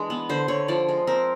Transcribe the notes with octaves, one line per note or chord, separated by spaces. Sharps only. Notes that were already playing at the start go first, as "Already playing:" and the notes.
Already playing: E3 G#3 D4
B3
D3 C5
D3 C#5
F3 D5
G#3
C4 A#4